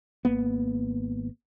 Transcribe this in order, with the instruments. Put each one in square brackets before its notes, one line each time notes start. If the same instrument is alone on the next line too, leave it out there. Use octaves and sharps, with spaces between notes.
[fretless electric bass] G#1 A#3 B3